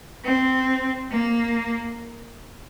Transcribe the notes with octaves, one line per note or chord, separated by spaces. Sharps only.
C4
A#3